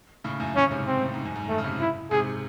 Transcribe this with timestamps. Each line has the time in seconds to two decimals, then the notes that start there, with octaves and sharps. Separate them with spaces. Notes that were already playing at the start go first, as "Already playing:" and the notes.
0.24 A2 C#3
0.40 F#2 A2
0.56 F#2 A2 C#4
0.66 C#3
0.71 G#2 C3
0.87 C4
1.02 A2
1.14 G#2
1.25 F#2
1.36 G#2
1.49 F#2 A3
1.58 C#3
1.64 G#2 C3
1.80 E4
2.11 G#2 C3 G#4